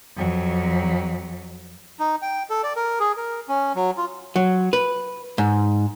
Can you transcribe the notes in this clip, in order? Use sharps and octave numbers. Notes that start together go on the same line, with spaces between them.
F2 F#3
D#4
G5
A4
D5
A#4
G#4
A#4
C#4
F#3
F4
F#3
B4
G#2